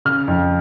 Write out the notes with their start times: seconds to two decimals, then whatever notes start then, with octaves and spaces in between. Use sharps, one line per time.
0.05 C#3 F6
0.27 F2